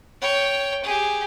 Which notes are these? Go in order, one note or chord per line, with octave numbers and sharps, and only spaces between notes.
C#5 G5
G4 G#4